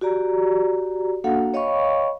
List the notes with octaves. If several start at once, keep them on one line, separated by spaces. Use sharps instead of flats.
F#4 G4 D5 A#5
A#3 D4 F#4 A4 F5 F#5
C#5 D#5 F5 G5 B5 C#6